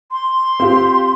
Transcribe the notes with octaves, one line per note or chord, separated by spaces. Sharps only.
C6
C4 F4 G4